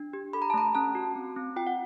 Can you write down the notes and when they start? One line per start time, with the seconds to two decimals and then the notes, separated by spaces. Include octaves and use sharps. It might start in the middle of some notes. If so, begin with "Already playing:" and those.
Already playing: D4
0.13 G4
0.33 A4 B5
0.42 A#5
0.50 A5
0.54 A3 A#5
0.75 C#4 A5
0.95 F#4
1.16 C4
1.36 C4
1.56 F4 G5
1.67 F#5